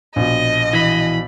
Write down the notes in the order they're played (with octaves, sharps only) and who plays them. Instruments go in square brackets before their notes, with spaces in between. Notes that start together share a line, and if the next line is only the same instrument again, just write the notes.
[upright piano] A#1 B2 [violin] D#5
[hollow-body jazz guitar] E3 [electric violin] B5